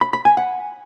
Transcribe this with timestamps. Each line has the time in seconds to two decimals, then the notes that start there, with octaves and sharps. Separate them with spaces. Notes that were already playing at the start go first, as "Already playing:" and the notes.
0.01 B5
0.13 B5
0.25 G#5
0.37 F#5